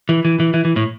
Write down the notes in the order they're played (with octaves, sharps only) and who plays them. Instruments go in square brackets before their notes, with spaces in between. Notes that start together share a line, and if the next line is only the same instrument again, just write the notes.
[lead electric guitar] E3
E3
E3
E3
E3
A2